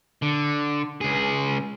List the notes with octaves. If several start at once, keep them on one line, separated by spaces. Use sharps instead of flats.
D3
C#2 G#4